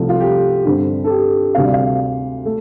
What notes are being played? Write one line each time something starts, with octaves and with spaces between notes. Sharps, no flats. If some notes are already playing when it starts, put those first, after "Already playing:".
Already playing: C2 C3 F3 A3
F4
G4
G2 D3 G3 C4
A4
G4
D2 C3 G3 C4 F5
D5
F5
A3